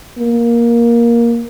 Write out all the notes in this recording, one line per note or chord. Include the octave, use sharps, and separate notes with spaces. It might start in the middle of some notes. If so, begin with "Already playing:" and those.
A#3